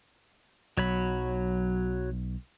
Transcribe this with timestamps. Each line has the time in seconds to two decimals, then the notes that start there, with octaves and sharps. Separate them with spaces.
0.77 B1 F#3 C#5 B5